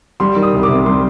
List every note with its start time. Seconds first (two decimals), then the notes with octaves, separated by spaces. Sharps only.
0.20 G3 C6
0.36 D#3
0.42 D#6
0.53 C2
0.63 D6
0.69 C3
0.86 G3 C6